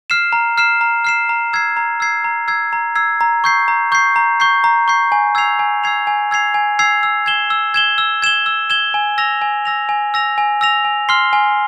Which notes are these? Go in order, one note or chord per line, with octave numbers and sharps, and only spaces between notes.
F6 C7 E7
A#5
F6 C7 E7
A#5
F6 C7 E7
A#5
E6 G#6 C7
A#5
E6 G#6 C7
A#5
E6 G#6 C7
A#5
E6 G#6 C7
A#5
C#6 G6 C7
A#5
C#6 G6 C7
A#5
C#6 G6 C7
A#5
C#6 G6 C7
G#5
E6 G#6 C7 F7
G#5
E6 G#6 C7 F7
G#5
E6 G#6 C7 F7
G#5
E6 G#6 C7 F7
E6
G#6 E7 G7
E6
G#6 E7 G7
E6
G#6 E7 G7
E6
G#6 E7 G7
G#5
E6 A#6 F7
G#5
E6 A#6 F7
G#5
E6 A#6 F7
G#5
E6 A#6 F7
G#5
C6 F6 C7 G7
G#5